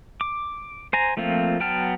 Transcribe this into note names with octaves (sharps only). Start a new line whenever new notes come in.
D6
C5 G#5 A#5
F3 A3 A#3 C4 F4
F#3 B3 G5 A5 F6